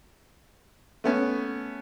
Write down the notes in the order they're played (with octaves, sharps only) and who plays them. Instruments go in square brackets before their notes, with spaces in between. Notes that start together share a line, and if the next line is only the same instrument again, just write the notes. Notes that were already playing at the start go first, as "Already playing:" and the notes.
[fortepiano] A3 B3 C#4